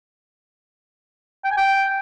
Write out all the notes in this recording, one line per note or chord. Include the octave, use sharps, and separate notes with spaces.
G5
G#5
G5